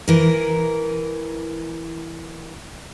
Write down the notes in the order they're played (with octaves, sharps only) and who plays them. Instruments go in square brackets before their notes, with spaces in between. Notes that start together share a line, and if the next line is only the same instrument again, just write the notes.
[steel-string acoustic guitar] E3 A#4